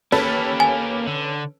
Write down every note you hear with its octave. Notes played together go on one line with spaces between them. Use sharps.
A#3 C#4 G4 A4 B4
G#5
D3